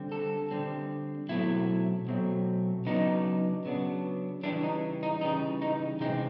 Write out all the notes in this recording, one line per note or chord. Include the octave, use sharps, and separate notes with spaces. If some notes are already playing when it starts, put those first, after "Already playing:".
Already playing: D3 G3 C4
A4
D3 G3 C4
B2 F#3 A3 C4 E4
B2 F#3 A3 C4
C#3 F#3 B3 D4 D#4
C#3 F#3 B3 D4
C#3 E3 G3 D4
D#4
D#4
C#3 E3 G3 D#4
D#4
C3 E3 G#3 C4 D#4